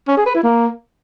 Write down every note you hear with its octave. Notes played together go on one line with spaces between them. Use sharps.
C#4
G#4
B4
E4
A#3